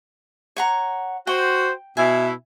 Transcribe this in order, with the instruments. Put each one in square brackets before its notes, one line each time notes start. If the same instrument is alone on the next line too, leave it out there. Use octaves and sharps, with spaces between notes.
[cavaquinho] C#5 F#5 A#5
[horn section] F#4 C5 [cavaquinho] G5
[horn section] B2 E4 [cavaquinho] E5 G#5